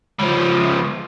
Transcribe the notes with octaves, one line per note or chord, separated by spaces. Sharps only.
C#2 F3